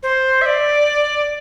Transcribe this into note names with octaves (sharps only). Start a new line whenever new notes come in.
C5
E5
D5